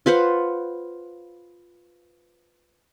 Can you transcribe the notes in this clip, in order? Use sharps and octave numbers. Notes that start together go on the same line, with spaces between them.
F4 B4 C5 F#5